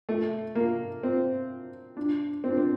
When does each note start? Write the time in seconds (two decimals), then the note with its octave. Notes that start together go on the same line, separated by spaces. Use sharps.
0.09 A3
0.55 A#3
1.03 C4
1.97 D4
2.44 C4
2.50 D4
2.58 C4